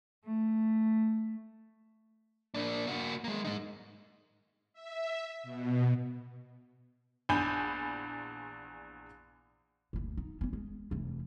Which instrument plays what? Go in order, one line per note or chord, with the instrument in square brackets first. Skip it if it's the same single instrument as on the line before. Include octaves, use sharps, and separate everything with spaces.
[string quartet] A3
[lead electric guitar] A#3 D4
A#3 F#4
G#3 A#3
G#3 D#4
[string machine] E5
B2
[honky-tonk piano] A#1 E2 D4 G#5 B5 G6
[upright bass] F#1 D2
D#4
B3 C#4
G#3
F1 E3